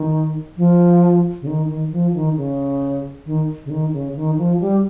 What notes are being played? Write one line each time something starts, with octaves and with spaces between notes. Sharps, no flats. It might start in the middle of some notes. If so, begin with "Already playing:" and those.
Already playing: D#3
F3
C#3
D#3
D#3
F3
D#3
C#3
D#3
C#3
D#3
C#3
D#3
F3
G3